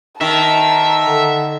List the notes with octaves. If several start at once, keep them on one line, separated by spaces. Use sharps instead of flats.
D#3 E5 A5 A#5
D3